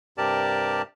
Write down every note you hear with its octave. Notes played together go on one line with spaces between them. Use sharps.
G2 C3 G4 A#4 D5 A5